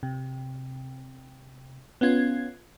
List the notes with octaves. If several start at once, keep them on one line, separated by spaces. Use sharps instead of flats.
C3
B3 C#4 F4 G#6